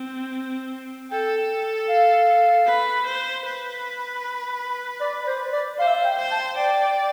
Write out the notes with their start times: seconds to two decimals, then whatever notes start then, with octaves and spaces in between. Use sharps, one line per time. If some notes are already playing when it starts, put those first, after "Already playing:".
Already playing: C4
1.11 A4 G5
1.89 F5
2.66 B4
3.06 C5
3.45 B4
5.01 D5
5.27 C5
5.53 D5
5.78 C5 F5
5.87 E5
5.95 F5
6.04 G5
6.18 C5
6.31 A5
6.57 D5 G5